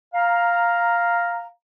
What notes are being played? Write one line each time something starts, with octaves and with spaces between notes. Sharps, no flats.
F5 A#5